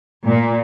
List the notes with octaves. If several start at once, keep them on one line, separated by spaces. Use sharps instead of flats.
A#2